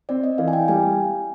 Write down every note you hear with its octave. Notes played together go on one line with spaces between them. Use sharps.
C4 D5
D#5
E3 F5
G#5
G5
G3 G#5